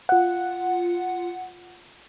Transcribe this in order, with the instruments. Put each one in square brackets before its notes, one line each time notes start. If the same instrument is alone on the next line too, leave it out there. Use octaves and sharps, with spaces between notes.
[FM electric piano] F4 F#5